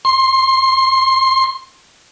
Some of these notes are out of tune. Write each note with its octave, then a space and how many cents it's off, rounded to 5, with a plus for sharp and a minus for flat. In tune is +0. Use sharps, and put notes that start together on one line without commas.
C6 +25